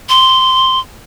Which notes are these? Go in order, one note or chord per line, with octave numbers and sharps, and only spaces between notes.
C6